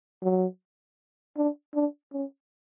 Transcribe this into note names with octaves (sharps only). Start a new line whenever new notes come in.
F#3
D4
D4
C#4